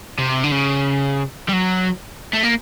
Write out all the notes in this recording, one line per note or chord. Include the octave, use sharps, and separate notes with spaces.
C3
D3
C#3
G3
F#3
A3
A#3